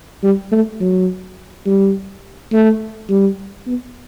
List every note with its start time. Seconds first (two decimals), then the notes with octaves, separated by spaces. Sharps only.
0.23 G3
0.52 A3
0.81 F#3
1.66 G3
2.52 A3
3.09 G3
3.67 B3